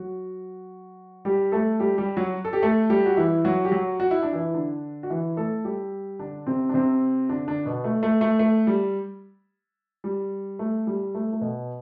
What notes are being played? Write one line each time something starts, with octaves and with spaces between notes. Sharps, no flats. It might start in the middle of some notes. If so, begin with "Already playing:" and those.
Already playing: F#3 F#4
G3 G4
A3 A4
G3 G4
G3 G4
F#3 F#4
A4
G4
A3 A4
G3 G4
F#4
E3 E4
F#3 F#4
G4
F#3 F#4
F#4
E4
D4
E3 E4
D3 D4
F#4
E3 E4
A3 A4
G3 G4
D3 D4
C3 C4
D4
C3 C4
D3 D4
D3 D4
B2 B3
A3
A3
A3
A3
G3
G3
A3
G3
A3
A3
B2 B3